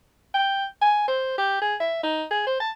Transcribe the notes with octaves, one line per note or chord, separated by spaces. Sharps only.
G5
G#5
C5
G4
G#4
E5
D#4
G#4
C5
A5